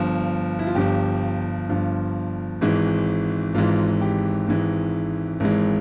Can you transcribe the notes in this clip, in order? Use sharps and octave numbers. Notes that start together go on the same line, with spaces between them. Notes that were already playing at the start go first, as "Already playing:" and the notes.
Already playing: G1 G2 F3
E4
F4
G1 G2 F3 G4
G1 G2 F3 F4
G#1 G#2 E3 G#3
G#1 G#2 E3 G#3 F4
G4
G#1 G#2 E3 G#3
G#1 G#2 E3 G#3